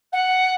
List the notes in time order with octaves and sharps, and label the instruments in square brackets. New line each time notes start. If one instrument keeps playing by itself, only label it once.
[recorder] F#5